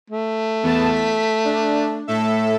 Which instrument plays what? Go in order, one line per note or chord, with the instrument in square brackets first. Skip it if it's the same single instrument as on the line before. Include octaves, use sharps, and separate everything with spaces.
[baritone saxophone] A3
[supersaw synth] E2 B3 A5
B6
D4
A2 A4 E5